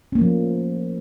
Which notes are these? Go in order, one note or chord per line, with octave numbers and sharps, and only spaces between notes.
F3 A3 A#3 C#4